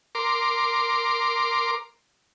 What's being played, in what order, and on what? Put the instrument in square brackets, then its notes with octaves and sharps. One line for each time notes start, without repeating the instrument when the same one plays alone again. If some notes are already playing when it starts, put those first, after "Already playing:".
[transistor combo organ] A#4 C6 D6